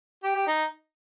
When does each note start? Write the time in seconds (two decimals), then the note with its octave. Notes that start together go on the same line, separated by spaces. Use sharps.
0.24 G4
0.35 G4
0.47 D#4